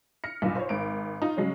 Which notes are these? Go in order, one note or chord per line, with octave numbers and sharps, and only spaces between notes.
F6 A#6 C#7
B1 G2 A#2
C5 C#5
G#1 D7
D#4 F4
C#3 F#3 G#3 C#4